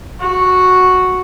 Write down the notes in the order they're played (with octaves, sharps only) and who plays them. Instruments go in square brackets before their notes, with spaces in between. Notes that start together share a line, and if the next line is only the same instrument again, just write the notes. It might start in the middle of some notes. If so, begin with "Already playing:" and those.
[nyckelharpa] F#4